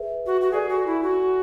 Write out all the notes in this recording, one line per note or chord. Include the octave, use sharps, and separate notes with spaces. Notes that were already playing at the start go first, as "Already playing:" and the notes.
Already playing: G#4 B4 E5
F#4
F#4
G#4 A4 D5 G#5
F#4
E4
F#4